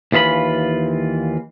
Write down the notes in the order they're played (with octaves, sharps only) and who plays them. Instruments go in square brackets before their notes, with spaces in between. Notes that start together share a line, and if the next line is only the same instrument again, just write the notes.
[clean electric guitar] D#2 E3 F4 E5 B5